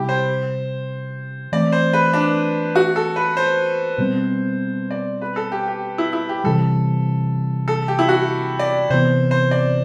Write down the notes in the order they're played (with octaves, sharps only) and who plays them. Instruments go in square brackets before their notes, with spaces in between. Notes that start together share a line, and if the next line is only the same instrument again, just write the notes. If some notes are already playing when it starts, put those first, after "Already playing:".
Already playing: [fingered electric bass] C3 G3 [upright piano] E4 G4
[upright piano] C5
[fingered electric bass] E3 A3 C4 [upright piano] D5
[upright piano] C5
B4
D4
F#4
A4
B4
C5
[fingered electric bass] B2 G3 C4
[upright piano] D5
B4
A4
G4
G4
E4
E4
G4
[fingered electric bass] C3 E3 G3 [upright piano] A4
[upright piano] A4
G4
E4
F#4
D5
[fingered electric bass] C3 E3 B3 [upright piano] C5
[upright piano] C5
D5